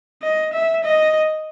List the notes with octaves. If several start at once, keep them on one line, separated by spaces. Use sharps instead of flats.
D#5
E5
D#5